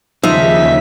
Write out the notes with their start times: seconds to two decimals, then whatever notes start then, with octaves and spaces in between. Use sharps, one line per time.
0.23 D#2 C#3 F3 D#4 E5 B6